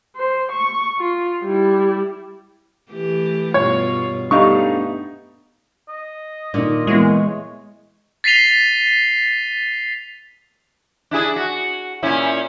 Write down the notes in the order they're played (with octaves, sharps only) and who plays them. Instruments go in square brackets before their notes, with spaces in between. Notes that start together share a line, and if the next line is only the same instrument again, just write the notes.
[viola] C5
C#6
F4
G3 E4
[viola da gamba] E3 A3 G4
[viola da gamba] G2 B2 F4 [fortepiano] C#5
[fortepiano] G3 D#4 C#6 [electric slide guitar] A3 D4 F5 [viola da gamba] B3
[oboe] D#5
[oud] A#2 [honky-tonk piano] D3 D#3
[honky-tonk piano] E3 B3 E4 [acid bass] G#3 [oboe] C#5
[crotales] A6 B6 C7 D#7 F7 G7
[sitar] D4 E4 G#4
F#4
A#2 C#4 E4